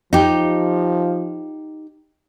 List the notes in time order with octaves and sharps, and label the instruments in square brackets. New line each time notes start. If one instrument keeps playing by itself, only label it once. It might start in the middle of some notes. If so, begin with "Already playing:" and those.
[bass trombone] F3 [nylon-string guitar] D#4 G4